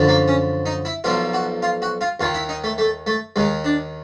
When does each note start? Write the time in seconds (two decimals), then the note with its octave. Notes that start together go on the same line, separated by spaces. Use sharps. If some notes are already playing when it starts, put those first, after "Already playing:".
Already playing: F#2 D3 F3
0.08 A#3
0.28 C#4
0.66 D#4
0.85 E4
1.04 B1 A#2 F3 F4
1.33 F#4
1.62 F4
1.82 F#4
2.01 F4
2.20 D#2 D#3 F4
2.34 E4
2.49 D#4
2.64 A3
2.78 A3
3.07 A3
3.36 D#2 D#3 G#3
3.65 D4